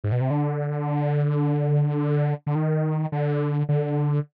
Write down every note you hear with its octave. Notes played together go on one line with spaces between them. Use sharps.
G#2
B2
C3
D3
D3
D#3
D3
D3